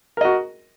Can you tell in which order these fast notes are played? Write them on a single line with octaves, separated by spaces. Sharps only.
A#4 D#5 F#4